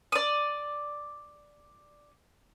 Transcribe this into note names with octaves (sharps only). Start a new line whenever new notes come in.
D5 D#6